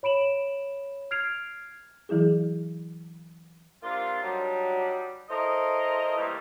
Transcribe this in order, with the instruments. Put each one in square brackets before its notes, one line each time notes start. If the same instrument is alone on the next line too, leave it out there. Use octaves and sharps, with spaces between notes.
[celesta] C#5 B5 D7 E7 F#7
F6 G#6 C7 D7 F7
[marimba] E3 F#3 E4 G#4
[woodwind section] C3 A#3 C4 D4 F4
F#3 G3 D4 D#4
E4 A4 A#4 C5 D#5
E3 G3 A3 A#3